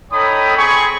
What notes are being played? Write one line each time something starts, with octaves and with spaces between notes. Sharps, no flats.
D#4 A4 C#5 G5 B5 D#6
C4 G#4 G#5 B5 C#6